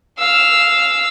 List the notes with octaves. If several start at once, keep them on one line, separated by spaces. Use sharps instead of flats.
F5 E6